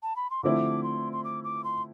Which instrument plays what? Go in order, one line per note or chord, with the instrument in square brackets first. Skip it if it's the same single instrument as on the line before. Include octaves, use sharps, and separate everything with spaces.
[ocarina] A5
B5
C6
[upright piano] D3 F3 A3 C4 E4 [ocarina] D6
[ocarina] C6
C6
D6
D6
C6